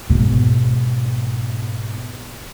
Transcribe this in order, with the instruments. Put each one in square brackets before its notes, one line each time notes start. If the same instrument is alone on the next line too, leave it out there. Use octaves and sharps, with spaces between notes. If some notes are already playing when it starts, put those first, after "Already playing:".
[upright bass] G#2 B2